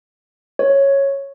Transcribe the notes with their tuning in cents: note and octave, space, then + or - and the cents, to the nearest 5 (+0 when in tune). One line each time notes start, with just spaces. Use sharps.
C#5 -5